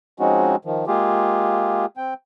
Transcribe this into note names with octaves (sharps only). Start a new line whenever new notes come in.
F3 G#3 C4 C#4 D#4 F#4
D#3 F3
G#3 A#3 F4 G4 G#4
C4 G5